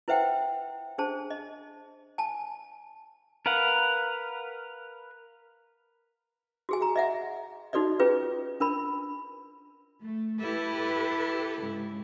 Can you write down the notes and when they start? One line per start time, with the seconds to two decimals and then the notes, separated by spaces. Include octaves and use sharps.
0.08 E4 B4 C5 E5 F#5 G5
0.98 D4 G#4 C5 A5
1.30 D#5
2.18 G#5 A5
3.46 A#4 B4 F5 F#5
6.69 F#4 G#4 G#5
6.81 G#4 A#5
6.96 D#5 E5 F#5
7.73 D#4 F#4 A4 D5 D#5
8.00 C#4 F4 G#4 B4
8.60 D4 A#4 B5
10.02 A3
10.41 E4 G4 A4 B4
11.62 G#2 C#3